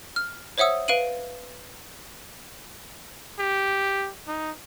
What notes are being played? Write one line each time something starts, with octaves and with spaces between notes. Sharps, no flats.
F6
C5 C#5 E5 F#5 D#6 E6
B4 F5 D7 D#7 F#7
G4
D#4